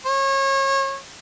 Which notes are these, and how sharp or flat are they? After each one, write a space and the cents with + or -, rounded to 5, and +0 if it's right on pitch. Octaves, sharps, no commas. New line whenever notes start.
C#5 -30